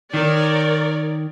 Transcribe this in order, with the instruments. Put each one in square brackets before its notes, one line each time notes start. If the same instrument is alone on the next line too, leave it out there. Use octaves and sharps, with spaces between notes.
[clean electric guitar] D#3 [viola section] A#4 C#5 D5